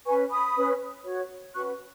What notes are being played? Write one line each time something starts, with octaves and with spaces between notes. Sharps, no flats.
C#4 B4 G#5 C#6
B5 D#6
C#4 B4
F#4 C#5
C#4 F#4 B4 C#6 F#6